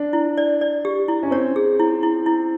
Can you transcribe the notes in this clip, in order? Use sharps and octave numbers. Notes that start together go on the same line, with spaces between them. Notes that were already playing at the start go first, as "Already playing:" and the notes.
Already playing: D4
E4
D5
D5
G4
E4
C#4
C4 C#5
G#4
E4
E4
E4